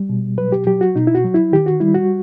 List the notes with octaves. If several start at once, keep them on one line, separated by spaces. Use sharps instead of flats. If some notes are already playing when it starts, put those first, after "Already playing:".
Already playing: G3
B2
F#3 B4
G4
F#3 G4
F#4
B2 D#4
E4
F#4
F#3
E4
D#3 G4
F#4
G3 E4
F#4